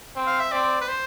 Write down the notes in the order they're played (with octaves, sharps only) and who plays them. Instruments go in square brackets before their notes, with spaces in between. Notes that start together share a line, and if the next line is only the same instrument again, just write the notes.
[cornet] C4
[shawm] F5
E5
[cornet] C4 [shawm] D5
[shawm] B4
C5